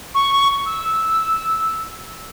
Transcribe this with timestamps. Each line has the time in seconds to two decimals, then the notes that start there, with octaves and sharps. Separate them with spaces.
0.15 C#6
0.66 E6